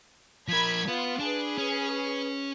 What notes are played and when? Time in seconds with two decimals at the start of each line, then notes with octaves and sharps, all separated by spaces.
0.48 F3 A#4 B5 G#6 B6
0.88 B3 F4 B4
1.20 D4 G#4 B4
1.58 C#4